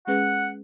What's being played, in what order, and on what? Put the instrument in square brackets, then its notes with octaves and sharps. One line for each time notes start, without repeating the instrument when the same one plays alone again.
[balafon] G#3 C#4 G#4 B4 [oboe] F#5